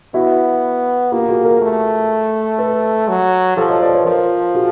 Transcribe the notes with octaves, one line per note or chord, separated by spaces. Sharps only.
B3 E4 F#4
A#3 F4 G4
G4
F#4 G#4
G#4 A#4
A3
A4 B4
F#3
F3 G4 A4
C#5 D#5
C5 D5
B4 C#5
F3 A#4 C5
F#4 G#4